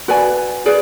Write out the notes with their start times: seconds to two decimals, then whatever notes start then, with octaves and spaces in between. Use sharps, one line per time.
0.08 F#4 B4 D5 G#5
0.66 G#4 B4 D5